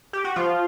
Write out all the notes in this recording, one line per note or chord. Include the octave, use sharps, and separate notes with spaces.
G4
F#4
F3 F4